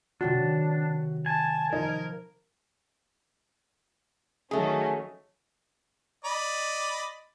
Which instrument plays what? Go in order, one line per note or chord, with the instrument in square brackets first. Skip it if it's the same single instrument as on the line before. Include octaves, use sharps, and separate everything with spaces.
[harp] C3 D#3 F#3 [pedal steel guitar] D4 [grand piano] F#4
[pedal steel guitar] G#5 [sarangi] A5
[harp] F3 [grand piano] D#4 [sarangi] A#4
[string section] D#3 F#3 C#4 [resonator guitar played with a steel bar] A3 G#4
[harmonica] D5 D#5 B5